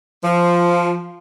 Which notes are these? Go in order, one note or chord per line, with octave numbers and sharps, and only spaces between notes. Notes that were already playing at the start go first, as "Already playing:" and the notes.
F3